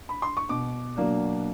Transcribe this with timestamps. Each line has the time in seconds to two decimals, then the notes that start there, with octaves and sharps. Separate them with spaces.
0.09 B5
0.22 C6
0.37 C#6
0.49 B2 D6
0.96 F#3 A#3 D4